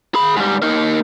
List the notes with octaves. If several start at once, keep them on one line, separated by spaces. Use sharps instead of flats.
G#4 B5
G#2 G3
A#3 D#4